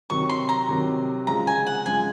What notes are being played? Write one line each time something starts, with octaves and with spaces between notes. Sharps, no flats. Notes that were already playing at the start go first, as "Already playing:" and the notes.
C3 D#3 F#3 C#6
C6
A#5
C3 D#3 F#3
C#3 F3 G#3 A#5
G#5
F#5
C#3 F3 G#3 G#5